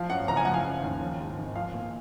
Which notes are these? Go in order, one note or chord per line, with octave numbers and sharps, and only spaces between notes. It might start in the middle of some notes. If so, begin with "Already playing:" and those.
Already playing: F3 F5
F#2 F#5
F#1 A#5
G#5
F3 F#5
F5 G#5
C#3
D#2
F3
G#2
G#1
F3 F5
A#2